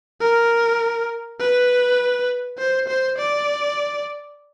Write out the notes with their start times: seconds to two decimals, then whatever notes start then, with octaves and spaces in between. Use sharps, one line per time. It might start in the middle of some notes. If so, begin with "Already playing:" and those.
0.21 A#4
1.40 B4
2.58 C5
2.88 C5
3.18 D5